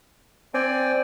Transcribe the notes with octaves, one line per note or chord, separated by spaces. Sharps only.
C4 D5 G5 G#5